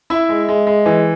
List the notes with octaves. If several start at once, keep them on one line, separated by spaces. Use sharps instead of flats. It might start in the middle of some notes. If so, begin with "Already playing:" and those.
E4 E5
G#3
G#3
G#3
E3